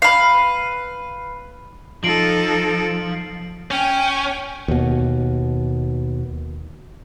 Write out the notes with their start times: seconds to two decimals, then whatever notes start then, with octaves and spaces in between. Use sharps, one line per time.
0.02 B4 F5
2.04 F3 D#4 A4 C7 D7 F#7
3.71 C#4 G5 G#5
4.68 D#2 B2